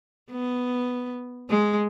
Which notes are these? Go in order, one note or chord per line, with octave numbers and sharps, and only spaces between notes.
B3
G#3